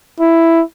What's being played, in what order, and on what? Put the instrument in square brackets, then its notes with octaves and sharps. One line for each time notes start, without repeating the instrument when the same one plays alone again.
[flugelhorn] E4